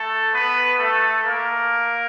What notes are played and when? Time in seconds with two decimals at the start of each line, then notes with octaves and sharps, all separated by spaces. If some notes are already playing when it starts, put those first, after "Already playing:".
Already playing: A3 A4
0.32 B3 B4
0.77 A3 A4
1.24 A#3 A#4